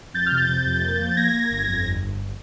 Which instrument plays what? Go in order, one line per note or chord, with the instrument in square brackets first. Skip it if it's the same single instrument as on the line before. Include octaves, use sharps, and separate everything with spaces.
[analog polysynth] F2 G6 A6
F6 G6
C3
G6 A6
C3
F2
A#3
F3
A6
A#3 G#6 A#6
A#3
G1
F2
G1
G1